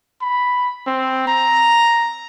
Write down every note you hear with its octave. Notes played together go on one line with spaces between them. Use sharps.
B5
C4
A#5